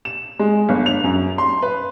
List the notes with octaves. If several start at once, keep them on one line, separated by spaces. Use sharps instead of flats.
E7
G#3
G1
F7
F#2
C6
B4